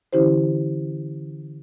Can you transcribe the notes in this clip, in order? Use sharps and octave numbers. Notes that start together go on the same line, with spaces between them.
D3 E3 C#4 E4 G4 C5